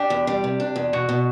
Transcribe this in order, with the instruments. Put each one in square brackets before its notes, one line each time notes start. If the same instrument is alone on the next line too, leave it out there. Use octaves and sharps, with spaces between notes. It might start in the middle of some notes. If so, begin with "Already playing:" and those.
Already playing: [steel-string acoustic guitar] D4 [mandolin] G4
[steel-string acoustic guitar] E2
G3
C3
D4
E2
[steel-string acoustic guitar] B2 [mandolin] F#4
[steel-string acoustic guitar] B2